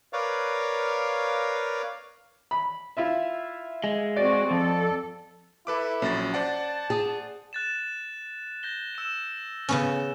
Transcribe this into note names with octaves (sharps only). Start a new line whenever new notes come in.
A#4 B4 C#5 D5 F5
B5
E4 F4 E5
G#3
C4 F#4 D5
F2 A4
E4 A4 B4 D6
A#1 F#3 C#4 A6
C5 D5 F#5 A5
G#4
F#6 A6 E7
G6 A#6 G7
E6 E7
C#3 B3 C#4